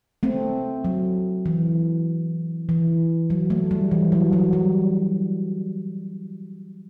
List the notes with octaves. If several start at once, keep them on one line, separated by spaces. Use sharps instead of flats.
A3 C4
F#3
E3
E3
F#3
A3
G3
E3
F#3
F#3
G3